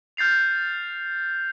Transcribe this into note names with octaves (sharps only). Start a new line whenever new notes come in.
F6 G6 A6 C7 F7